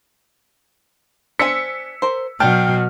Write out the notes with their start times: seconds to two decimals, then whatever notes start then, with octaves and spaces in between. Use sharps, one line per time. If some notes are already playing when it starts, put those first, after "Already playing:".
1.39 D4 C5 G#5 E6 B6 C#7
2.02 A#4 C5
2.40 B2 F#3 D4 G5 A5 F6